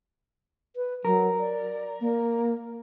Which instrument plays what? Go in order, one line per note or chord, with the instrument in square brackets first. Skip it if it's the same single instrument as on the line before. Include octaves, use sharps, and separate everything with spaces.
[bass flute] B4
[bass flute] F#3 [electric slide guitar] A#4
[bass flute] D5
A#3